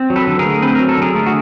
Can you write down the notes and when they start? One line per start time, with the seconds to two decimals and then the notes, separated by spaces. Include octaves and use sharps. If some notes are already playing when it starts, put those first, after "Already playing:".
Already playing: C4
0.10 F#3
0.16 A4 B4
0.27 D3
0.39 G#4 A#4
0.45 A3
0.62 C4 B4
0.75 F#3 A#4
0.89 A4
0.97 D3 G#4 A#4
1.15 A3
1.27 F#4